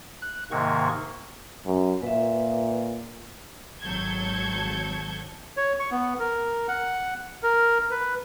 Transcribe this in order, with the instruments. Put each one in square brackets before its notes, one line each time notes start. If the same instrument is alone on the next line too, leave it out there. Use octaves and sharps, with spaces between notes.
[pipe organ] F#6
G#2 C3 D#3 A#3 C#6
[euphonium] F#2
[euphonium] A#2 [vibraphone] B4 E5
[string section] G#1 F#3 A4 G6 G#6 C#7
[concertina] C#5
C#6
B3
A#4
F#5
A#4
B4